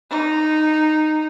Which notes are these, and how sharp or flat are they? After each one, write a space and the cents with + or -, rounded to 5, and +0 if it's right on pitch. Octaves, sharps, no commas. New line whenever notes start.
D#4 -10